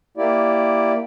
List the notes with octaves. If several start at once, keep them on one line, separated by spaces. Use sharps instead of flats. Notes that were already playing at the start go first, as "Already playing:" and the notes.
A#3 E4 G4 D5